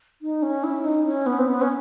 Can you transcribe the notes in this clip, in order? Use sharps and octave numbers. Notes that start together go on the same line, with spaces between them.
D#4
C#4
E4
D#4
C#4
B3
C4
B3
C#4